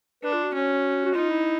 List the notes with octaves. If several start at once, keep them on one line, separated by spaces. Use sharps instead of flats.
D4 B4
F4
F#4
C#4
F#4
D#4 F4
E4